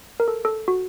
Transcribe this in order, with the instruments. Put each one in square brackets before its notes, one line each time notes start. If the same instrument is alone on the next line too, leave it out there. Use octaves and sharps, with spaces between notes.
[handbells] A#4
A4
A4
F#4